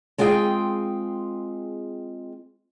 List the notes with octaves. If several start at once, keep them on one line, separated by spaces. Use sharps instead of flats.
G#3 C4 F4 G#4 G5